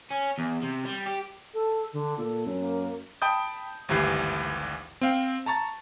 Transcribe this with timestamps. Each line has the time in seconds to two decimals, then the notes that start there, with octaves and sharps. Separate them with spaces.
0.10 C#4
0.38 E2
0.62 C3
0.85 G3
1.07 G4
1.54 A4
1.93 D3
2.18 A#2 A4
2.46 F#2
2.59 A#3
3.22 G5 A5 B5 D#6 G6
3.89 G#1 D2 G2 E3 G4 C7
5.01 C4 F5 G5
5.46 A5 A#5 C#6 A6